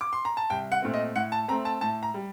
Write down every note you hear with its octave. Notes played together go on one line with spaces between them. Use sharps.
D6
C6
A#5
A5
C2 G5
F#5
A#2 A3 C4
D#5
A2 F#5
A5
A3 C4 A#5
A5
A2 A5
A#5
G3